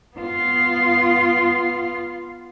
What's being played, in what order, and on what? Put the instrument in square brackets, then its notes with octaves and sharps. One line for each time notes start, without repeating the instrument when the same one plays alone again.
[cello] B3 F4